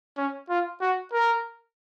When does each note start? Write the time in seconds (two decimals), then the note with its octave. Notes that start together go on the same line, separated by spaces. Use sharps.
0.17 C#4
0.50 F4
0.81 F#4
1.13 A#4